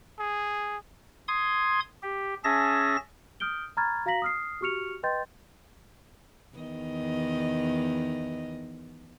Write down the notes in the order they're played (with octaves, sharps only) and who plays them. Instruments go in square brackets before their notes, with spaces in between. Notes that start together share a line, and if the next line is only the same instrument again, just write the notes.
[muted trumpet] G#4
[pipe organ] C6 D#6 G#6
G4
C#4 G#4 E5 A5 A#6
[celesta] D#6 F6 G6 D7 G7
A#5 B5 C#6 F6 G#6 A6
F#4 F5 A#5 A#6 B6 F#7
D#6 F6 C7
F#4 G4 C#6 F6 C#7 F7
B4 D#5 G5 C6 G6 A6
[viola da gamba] E2 D#3 D#5